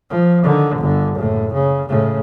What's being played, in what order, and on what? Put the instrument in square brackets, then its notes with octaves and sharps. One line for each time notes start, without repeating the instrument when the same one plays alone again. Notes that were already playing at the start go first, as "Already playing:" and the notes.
[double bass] F3
D3 D#3
G1 D3
F#1 A2
C#3
A2 C#3